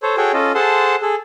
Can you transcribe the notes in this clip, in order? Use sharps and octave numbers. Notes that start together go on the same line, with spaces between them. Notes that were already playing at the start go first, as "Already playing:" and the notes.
A4 C5 C#5
F#4 G#4 A4 C#5 G5
C#4 F4 A4 D#5
G#4 A4 C5 F#5 A5 C6
G#4 A4